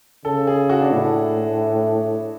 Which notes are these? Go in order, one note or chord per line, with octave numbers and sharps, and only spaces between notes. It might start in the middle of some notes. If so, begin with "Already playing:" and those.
C#3 A4
G#4
F#4
D4
A2 E4